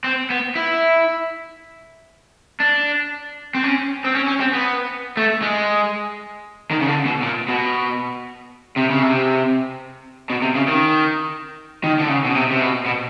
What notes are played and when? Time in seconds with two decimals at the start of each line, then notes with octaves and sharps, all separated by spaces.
0.04 C4
0.30 B3
0.55 E4
2.60 D4
3.55 C4
3.64 C#4
4.04 C4
4.15 C#4
4.27 C#4
4.40 C4
4.53 B3
5.17 A3
5.42 G#3
6.71 D#3
6.82 C#3
6.88 D3
7.05 B2
7.22 A#2
7.48 B2
8.76 C3
8.90 C#3
9.02 C3
10.30 B2
10.42 C3
10.56 C#3
10.68 D#3
11.84 D#3
11.99 D3
12.09 C#3
12.25 B2
12.35 C3
12.51 C3
12.61 B2
12.86 B2